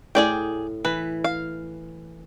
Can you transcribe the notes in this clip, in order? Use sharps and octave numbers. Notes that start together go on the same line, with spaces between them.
A2 G#4 D5 G5
E3 B4
F5